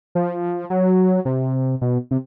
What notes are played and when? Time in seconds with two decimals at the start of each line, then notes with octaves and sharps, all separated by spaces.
0.15 F3
0.70 F#3
1.25 C3
1.81 B2
2.11 C3